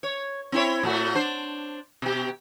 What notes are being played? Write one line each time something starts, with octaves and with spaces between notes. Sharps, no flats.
C#5
C4 E4 C#5
A2 A3 F#4
D4 C5
B2 G4